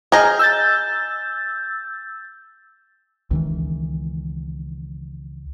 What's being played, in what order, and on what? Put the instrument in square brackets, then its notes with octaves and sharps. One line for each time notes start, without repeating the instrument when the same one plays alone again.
[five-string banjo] G#4 D#5 [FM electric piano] A#5 F6 G6
[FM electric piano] E6 G6 A6
[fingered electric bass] C#2 D#3 E3